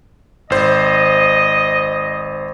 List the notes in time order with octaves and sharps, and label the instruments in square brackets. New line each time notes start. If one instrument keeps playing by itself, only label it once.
[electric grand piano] G#1 C5 [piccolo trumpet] D#5